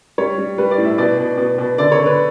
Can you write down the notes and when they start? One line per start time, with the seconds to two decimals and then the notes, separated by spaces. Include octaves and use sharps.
0.18 G3 C#5
0.38 G3
0.58 G3 B4
0.71 D5
0.78 A2
0.85 E5
0.98 B2 D5
1.18 B2
1.38 B2
1.58 B2
1.78 D3 D5
1.92 C#5
1.98 D3
2.06 B4